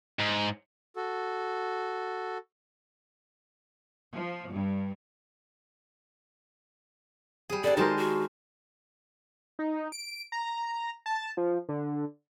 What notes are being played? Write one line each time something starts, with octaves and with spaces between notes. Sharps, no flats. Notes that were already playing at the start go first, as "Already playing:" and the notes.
G#2
F#4 A4
F3
G2
G3 G#4
G3 D4 A4 D5
D#3 G#3 F#4 G#4 A#4 C5 A5
F#4
D#4
D7
A#5
A5
F3
D3